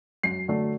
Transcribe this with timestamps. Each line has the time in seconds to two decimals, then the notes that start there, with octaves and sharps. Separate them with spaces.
0.23 F#2 C7
0.48 D3 F#3 A3